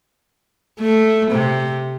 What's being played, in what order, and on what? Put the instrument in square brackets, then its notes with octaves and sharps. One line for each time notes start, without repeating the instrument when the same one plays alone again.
[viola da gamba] A3
C3